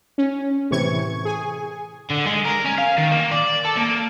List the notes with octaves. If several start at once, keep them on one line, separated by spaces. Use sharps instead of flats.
C#4
A2 C3 E3 C#6 G#6
G#4 G#5
D3
G#3
A#4
C#4
F5
D#3
A#3
D5
A4
A#3